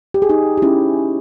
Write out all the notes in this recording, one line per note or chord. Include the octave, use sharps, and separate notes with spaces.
G4
G#4
D#4 G4
G4
C#4 E4